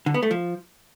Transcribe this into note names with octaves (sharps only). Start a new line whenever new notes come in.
D3
B3
A3
F3